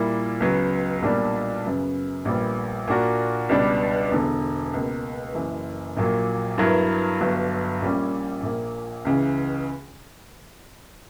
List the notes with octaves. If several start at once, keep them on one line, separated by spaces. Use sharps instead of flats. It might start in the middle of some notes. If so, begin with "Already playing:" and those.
Already playing: A#2 G3 A#3 E4
C#2 C#3 F#3 B3
B1 A#2 G3 A#3 D4
F#2 C#3 F#3 B3
A#1 A#2 G3 B3
A#2 A#3 D4 F#4 A#4
C#2 B2 G3 B3 D4
E1 E2 D3
C#2 B2 A#3
F#1 F#2 E3
A#1 A#2 F#3 A#3
G2 F#3 B3 E4 A#4
G1 G2 F#3
A#1 A#2 G3 C#4
A#1 A#2 A#3
C#2 C#3 E3